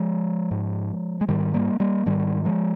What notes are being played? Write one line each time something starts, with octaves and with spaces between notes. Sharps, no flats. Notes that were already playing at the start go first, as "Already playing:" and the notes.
Already playing: F3 G#3
G#2
G#3
G#2 D#3 G3
G3 A#3
G3 A#3
G#2 D#3 G3
F3 G#3